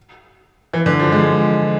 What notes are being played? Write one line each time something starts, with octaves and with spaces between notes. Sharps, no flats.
E3
D3
F3
G#3